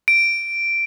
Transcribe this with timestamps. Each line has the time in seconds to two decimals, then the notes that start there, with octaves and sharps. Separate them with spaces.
0.08 D7